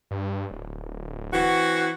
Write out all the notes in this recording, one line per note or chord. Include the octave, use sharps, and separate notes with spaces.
G2
D1
E3 C4 F#4